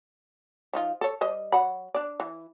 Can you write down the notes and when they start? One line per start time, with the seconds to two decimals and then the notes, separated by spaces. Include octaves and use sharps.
0.73 F3 D#4 F4
1.01 A4 C#5
1.21 G3 C5 D#5
1.52 F#3 F#5 B5
1.94 D4 D5
2.20 E3